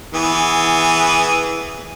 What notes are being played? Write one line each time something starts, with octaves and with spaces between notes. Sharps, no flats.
E3 B3 G#4